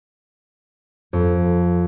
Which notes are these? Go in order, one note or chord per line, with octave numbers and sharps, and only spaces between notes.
F2